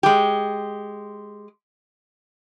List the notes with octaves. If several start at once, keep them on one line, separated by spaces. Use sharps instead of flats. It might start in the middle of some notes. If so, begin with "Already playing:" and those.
G#3 G4